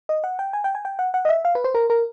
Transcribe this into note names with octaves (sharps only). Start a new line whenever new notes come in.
D#5
F#5
G5
G#5
G5
G#5
G5
F#5
F#5
D#5
E5
F5
B4
C5
A#4
A#4